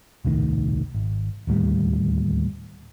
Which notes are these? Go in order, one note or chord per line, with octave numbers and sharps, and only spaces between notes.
D#1 C2 A2 D#3
G#1
D1 D#2 A2 G3